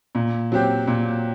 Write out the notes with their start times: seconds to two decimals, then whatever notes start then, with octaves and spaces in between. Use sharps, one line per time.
0.15 A#2
0.52 F#3 C4 G4
0.87 A#2